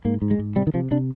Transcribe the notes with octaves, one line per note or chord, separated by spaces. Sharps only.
G#2 A#3
G#2
G#3
G#2
C3 G3
D#3
C3 F3
C3 D4